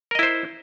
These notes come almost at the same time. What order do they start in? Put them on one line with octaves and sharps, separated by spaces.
A#4 D#5 E4 C5